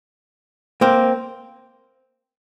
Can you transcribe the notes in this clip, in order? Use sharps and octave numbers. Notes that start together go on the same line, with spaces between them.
A#3 C4